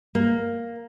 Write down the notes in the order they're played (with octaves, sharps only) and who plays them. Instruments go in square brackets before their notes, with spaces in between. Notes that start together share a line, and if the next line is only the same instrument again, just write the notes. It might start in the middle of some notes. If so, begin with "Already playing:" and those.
[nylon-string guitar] A#3